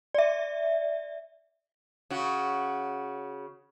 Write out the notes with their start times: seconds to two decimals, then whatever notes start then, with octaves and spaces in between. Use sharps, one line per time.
0.14 D5 E5
2.10 C#3 F#4